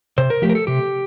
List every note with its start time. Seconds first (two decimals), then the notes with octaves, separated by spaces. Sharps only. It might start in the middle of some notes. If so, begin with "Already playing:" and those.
0.18 C3 C5
0.30 A#4
0.42 F3 A3 G4
0.49 A#4
0.55 A4
0.67 C3 G4